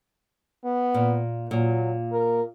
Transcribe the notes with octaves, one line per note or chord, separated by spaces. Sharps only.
B3
A#2
A#2 F#3
A#4